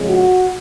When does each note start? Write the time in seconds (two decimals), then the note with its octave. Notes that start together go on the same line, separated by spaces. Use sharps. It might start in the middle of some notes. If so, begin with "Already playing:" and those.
Already playing: F2 C#3 G#3
0.08 F#4